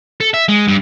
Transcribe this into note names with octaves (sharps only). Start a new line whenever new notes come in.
A4
E5
G#3
G2